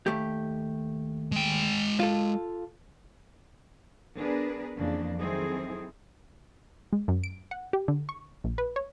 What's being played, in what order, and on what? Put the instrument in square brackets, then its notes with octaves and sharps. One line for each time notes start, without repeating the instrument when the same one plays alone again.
[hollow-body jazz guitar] D#2 A3 G4
[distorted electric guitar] G#3 G5
[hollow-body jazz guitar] F4 A4
[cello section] B3 D4 G#4 A#4 B4
F2 C#3 E3 A#3 D4
D#3 F#3 C4 E4 G#4 A4
[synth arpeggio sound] G#3
F#2
D7
F#5
G4
D3
C#6
A#1
B4
C#5